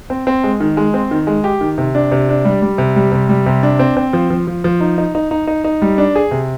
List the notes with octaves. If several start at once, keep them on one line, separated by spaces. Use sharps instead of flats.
C4
C4
G#3
D#3
G#3
C4
D#3
G#3
G4
D#3
C3
D4
C3
D4
G3
G3
C3
G3
C3
G3
C3
D4
C4
C4
F3
F3
F3
F3
D#4
D#4
D#4
D#4
D#4
D#4
G3
D4
G#4
C3